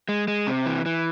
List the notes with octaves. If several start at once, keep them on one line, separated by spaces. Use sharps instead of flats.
G#3
G#3
C3
E3
E3